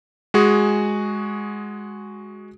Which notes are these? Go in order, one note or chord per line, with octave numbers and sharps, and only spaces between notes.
G#3 F#4 G#4